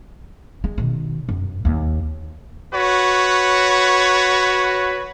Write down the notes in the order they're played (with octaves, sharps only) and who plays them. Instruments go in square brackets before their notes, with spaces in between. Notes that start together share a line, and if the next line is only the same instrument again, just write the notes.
[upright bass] G#3
B2 D#3
F#2
D#2 A#3
[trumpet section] F#4 B4 C#5